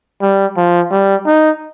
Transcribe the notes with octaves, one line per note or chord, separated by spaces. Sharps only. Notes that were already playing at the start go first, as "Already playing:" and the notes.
G3
F3
G3
D#4